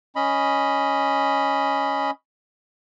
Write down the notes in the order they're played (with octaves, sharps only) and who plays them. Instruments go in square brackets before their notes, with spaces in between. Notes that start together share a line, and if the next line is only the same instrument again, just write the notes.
[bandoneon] C#4 D#5 B5